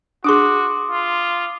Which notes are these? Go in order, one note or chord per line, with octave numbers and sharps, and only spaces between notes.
D4 F#4 G#4 C6 D6 D#6
F4